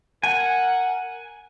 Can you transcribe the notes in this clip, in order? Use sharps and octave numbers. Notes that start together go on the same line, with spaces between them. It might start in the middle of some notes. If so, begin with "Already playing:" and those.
A#4 F#5 G#5